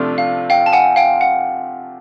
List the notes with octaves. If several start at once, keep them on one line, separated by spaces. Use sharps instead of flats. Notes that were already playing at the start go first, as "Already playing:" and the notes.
Already playing: C3 F3 A3 D4 F4
F5
F5 G5
A5
F#5 G#5
F5 G5
F#5